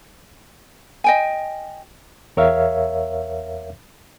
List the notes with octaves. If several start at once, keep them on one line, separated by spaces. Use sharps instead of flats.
D#5 G5 G#5
E2 A#4 C#5 E5 F5